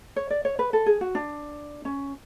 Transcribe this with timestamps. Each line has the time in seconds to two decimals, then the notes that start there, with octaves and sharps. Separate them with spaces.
0.16 C#5
0.30 D5
0.45 C#5
0.59 B4
0.73 A4
0.86 G#4
1.01 F#4
1.15 D4
1.85 C#4